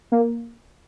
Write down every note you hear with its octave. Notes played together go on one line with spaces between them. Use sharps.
A#3